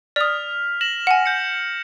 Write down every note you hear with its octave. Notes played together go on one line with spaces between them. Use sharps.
D5 D#6 F6 B6 F7
A#6 E7 F#7
F#5 G#5
G6 C#7